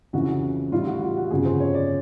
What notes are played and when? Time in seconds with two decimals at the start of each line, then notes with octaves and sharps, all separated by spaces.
0.13 F2 C#3 E3 F#4
0.72 A2 E3 G3 F4
0.82 F4
0.87 F#4
1.02 F4
1.17 F#4
1.31 G1 F2 C#3 F3 G#4
1.45 C5
1.60 C#5
1.74 D5